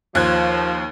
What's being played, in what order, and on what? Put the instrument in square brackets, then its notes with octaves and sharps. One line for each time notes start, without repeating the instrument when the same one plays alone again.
[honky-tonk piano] D#2 F#6 G#6 [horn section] F3